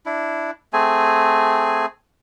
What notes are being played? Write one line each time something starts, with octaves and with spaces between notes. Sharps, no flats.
D4 E4
A3 C4 G#4 G#5